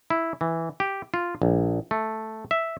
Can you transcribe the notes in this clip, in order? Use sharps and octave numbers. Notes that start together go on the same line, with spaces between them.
E4
E3
G4
F4
A#1
A3
E5